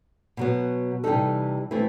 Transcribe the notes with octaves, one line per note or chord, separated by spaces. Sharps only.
B2 F#3 B3
C3 E3 G3 D#4 A4
E3 A3 C4 E4 B4